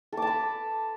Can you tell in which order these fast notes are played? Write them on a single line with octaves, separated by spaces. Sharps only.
A4 D6 A5 B5